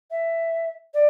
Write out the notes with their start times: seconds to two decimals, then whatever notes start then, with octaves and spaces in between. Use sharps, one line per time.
0.11 E5
0.94 D5